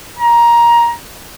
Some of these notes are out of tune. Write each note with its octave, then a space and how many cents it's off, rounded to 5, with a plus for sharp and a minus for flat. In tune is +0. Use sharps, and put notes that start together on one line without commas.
A#5 +15